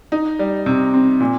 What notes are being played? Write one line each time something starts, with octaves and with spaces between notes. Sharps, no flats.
D#4
G3
C3
C4
A#2